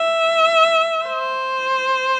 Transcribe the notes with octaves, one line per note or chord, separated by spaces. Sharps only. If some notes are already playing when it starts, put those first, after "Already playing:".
Already playing: E5
C5